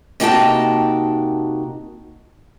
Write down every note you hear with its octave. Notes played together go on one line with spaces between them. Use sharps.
C3 A#3 D#4 F#4 G5 A5